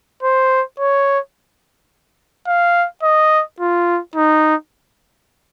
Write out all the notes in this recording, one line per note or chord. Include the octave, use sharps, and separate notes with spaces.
C5
C#5
F5
D#5
F4
D#4